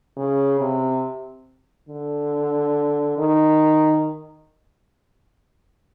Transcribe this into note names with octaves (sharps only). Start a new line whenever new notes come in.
C#3
C3
D3
D#3